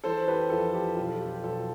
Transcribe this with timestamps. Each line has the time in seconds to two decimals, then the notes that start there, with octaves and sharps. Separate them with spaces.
0.04 E3 A4 C5
0.27 G4 B4
0.50 F2 F4 A4
0.74 G4
0.97 B1 F4
1.08 A4
1.20 G4
1.43 B1 F4 A4